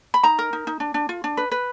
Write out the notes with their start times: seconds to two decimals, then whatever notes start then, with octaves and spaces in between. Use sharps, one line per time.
0.14 B5
0.23 D#4 A#5
0.39 A#4
0.53 D#4
0.67 D#4
0.80 D4
0.94 D4
1.09 F4
1.24 D4
1.37 B4
1.51 B4